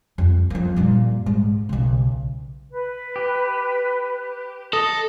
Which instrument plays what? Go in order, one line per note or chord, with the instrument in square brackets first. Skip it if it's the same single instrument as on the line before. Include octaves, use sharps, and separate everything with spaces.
[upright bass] F2
F2 A#3
G2 A#2
G#2
B1 C#3
[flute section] B4
[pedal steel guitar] G4
[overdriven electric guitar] A4 [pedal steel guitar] D#5